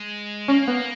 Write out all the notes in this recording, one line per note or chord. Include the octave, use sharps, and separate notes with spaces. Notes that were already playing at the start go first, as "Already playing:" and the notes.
Already playing: G#3
A#3 C#4
B3